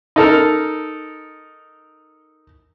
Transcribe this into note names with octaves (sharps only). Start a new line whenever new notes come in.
D#4 A4 A#4